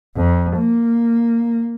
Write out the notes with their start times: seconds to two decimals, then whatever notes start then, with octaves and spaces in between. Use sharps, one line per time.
0.16 F2
0.58 A#3